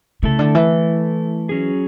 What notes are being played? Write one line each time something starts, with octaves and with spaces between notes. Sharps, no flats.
C#3 A3 E4 A4
D3
E3
F#3 C#4 G#4